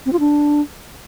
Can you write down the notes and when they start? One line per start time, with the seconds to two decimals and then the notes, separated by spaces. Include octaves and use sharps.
0.06 C4
0.13 F4
0.20 D4